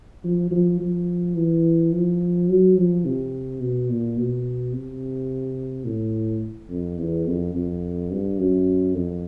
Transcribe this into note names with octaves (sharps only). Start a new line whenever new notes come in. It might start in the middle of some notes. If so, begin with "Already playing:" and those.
F3
F3
F3
E3
F3
F#3
F3
C3
B2
A#2
B2
C3
A2
F2
E2
F2
F2
G2
F#2
F2